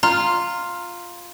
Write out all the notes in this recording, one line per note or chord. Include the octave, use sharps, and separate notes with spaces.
F4 A#5